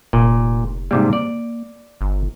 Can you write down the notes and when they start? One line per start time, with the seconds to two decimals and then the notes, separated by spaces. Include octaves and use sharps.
0.13 F1 A#2
0.91 G#2 C3 G3 A#3
1.13 D5
2.01 G1